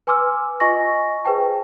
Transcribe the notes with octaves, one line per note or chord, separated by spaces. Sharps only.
B4 G#5 C6 D6 E6 F6
F4 D#5 G#5 C#6 A#6
G#4 B4 C5 G5 A5